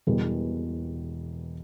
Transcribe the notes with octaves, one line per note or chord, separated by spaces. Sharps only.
E1 E2 B2 G3